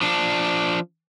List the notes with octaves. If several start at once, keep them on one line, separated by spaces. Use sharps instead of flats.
F3 D4